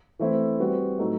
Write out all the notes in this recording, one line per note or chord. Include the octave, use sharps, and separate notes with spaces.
E3 A3 C4 E4
G3 C4 F#4 B4
A2 F#3 A3 D#4